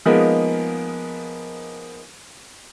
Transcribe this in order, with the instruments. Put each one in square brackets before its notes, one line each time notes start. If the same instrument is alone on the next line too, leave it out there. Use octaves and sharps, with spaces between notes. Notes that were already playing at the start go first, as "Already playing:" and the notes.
[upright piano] F3 G#3 A#3 B3 D#4